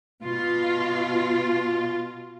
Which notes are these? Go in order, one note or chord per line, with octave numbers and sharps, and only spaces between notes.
B2 F4